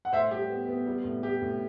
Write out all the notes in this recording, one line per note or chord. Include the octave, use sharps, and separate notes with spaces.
F#5
A2 C5 E5
G3 G4
B3
B3
G3
A2
A2 G4
A2